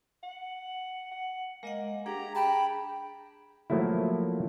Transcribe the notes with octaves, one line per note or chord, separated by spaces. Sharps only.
F#5
F#5
G#3 A#3 D#5 F#5
D4 G4 G#4 A#5
G5 A5 B5
F3 F#3 A3 A#3 E4